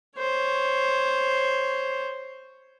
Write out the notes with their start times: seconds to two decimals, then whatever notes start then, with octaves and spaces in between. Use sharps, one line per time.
0.19 C5 C#5